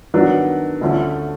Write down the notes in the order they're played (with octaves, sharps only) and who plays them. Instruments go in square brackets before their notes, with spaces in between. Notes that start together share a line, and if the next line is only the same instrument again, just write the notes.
[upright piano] D#3 F#3 B3 D4
D2 D3 F3 A3 C#4